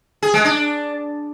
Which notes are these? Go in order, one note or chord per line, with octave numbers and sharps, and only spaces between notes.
G#4
G#3
D4